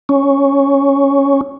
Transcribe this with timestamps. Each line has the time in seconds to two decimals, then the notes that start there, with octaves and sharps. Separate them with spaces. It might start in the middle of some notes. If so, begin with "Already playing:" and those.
0.09 C#4